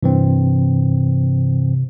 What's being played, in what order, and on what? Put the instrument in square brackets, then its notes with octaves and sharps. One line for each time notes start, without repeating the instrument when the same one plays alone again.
[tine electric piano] G2 E3 C4 [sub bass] C3